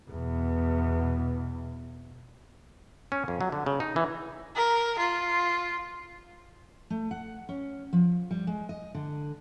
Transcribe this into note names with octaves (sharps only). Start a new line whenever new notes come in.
E2 B2
C#4
F2
F#3
D3
C#3
D#4
E3
A#4
F4
A3
F#5
C#4
F3
G3
G#3
D#5
D3